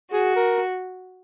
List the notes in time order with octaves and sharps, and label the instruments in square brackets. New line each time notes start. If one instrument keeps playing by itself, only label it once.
[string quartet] F#4 [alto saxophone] G#4
[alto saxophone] A#4